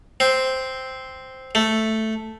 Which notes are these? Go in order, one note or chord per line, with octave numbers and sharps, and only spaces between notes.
C4
A3